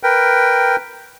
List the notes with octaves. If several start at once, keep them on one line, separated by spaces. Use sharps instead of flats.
A#4 B4 G5